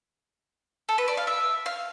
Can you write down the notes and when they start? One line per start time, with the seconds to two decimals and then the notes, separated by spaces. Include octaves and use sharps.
0.89 A4
0.98 B4
1.08 D5
1.17 F5
1.27 E5
1.66 F5